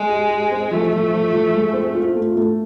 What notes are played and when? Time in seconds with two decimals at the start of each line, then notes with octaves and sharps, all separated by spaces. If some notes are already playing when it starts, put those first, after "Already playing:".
Already playing: G#3
0.09 G4
0.31 G4
0.51 C4
0.71 F3 A3
0.92 F3
1.13 F3
1.33 F3
1.54 G#3
1.73 C4
1.95 F4
2.15 A3
2.36 A3